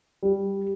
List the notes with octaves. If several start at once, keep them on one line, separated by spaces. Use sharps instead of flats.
G3